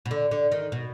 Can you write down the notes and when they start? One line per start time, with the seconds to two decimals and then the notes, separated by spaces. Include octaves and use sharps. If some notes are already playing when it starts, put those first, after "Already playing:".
0.06 B2
0.11 D3
0.31 D3
0.52 D#3
0.72 B2